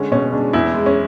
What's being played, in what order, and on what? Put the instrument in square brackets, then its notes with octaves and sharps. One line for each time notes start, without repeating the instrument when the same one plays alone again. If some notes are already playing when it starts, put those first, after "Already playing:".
Already playing: [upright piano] D3 G#3 C#4
B2 C#4
G#3 D4
E2 E4
G#3
C#4